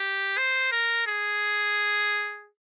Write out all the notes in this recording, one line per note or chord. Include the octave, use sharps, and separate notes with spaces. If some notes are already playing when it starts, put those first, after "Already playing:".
Already playing: G4
C5
A#4
G#4